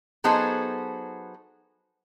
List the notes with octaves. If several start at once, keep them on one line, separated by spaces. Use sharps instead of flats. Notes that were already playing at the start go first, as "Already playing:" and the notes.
F#3 B3 D#4 G#4 A4 C5